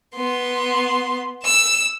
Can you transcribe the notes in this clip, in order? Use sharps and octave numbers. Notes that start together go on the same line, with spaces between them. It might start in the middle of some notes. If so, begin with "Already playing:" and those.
B3 C6
E6 E7